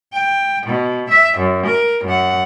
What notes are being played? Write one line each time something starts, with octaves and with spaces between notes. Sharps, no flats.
G5
B2
E5
F#2
A#4
F#2 F#5